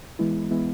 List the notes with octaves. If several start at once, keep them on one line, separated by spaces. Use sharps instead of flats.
E3 G#3 B3 E4
E3 G#3 B3 E4